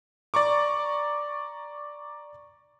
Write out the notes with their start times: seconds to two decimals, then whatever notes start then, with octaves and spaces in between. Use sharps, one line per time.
0.34 D5 A#5 C#6 D6